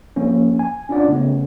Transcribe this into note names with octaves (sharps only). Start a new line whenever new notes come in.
F3 A#3 C#4
G#5
C#4 D4 F4 D5 F#5
C#3 A3 B3 C#4